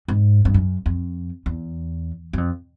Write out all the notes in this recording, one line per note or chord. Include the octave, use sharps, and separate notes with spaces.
G#2
G2
F#2
F2
E2
F#2
F2